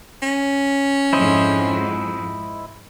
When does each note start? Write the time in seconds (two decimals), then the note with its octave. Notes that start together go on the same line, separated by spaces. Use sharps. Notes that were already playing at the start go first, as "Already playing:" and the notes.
0.22 C#4
1.13 F2 G#2 E4 C5 D#5